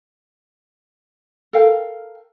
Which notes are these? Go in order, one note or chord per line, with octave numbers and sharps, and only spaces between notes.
A4 A#4 F5 G5